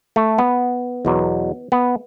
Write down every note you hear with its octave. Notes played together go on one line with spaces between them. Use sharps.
A3
B3
E2 B2 F#3
B3